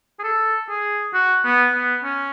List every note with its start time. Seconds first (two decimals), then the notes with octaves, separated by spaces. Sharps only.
0.19 G#4
0.23 A4
0.69 G#4
1.14 F#4
1.45 B3
1.74 B3
2.04 C#4